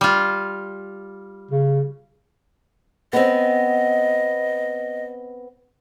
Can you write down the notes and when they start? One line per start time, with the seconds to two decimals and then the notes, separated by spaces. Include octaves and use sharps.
0.01 G3 F4
1.51 C#3
3.13 B3 C4 D#5